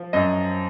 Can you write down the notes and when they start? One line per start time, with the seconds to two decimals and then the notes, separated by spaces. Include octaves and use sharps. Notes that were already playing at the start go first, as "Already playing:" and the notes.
Already playing: F3
0.13 F#2 D#5